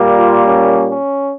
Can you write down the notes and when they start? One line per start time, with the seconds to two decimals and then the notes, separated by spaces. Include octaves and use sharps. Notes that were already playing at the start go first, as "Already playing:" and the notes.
Already playing: A#2 G3 A#3
0.17 F4
0.45 C#4
0.89 C#4